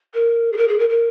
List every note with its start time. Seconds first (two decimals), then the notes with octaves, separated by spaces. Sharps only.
0.14 A#4
0.52 G#4
0.57 A#4
0.68 G#4
0.79 A#4
0.89 A#4